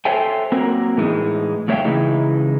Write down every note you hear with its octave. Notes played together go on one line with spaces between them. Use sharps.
A4 C5 C#5 E5 G5 G#5
F#3 A#3 C4 A#4
A2 E3 G#3 D#4
F2 A3 C#5 E5 F5 G5
C#3 E3 G#3 D#4 E4